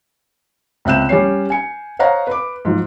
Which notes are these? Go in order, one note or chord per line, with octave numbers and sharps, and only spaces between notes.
C#2 C4 E5 F#6 G6 E7
G3 C#4 C#5 C7
G#5 C#7
C5 C#5 D#5 F5 F#5 A#5
B4 D6
G#2 F3 F#3